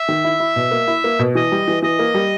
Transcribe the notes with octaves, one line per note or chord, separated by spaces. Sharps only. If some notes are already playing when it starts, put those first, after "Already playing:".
Already playing: E5
D#3
E4
E4
B2
A#3
E4
A#3
B2
E3 D#5
G3
E3
E3 D#5
A#3
G3